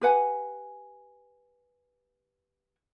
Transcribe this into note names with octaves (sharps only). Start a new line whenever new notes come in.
G4 B4 F#5 G#5